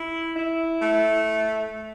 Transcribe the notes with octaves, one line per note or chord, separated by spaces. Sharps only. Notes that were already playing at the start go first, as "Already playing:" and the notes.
Already playing: E4
E4
A3